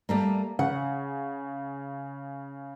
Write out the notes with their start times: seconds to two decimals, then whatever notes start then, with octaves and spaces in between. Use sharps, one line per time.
0.09 G3 A3 A#3
0.59 C#3 F#5